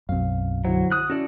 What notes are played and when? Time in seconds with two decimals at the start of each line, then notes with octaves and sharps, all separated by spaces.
0.09 B1 F#2 C4 F5
0.65 D3 F#3 E4 C5
0.92 D#6 F#6
1.10 C#4 E4 F#4 A4 D5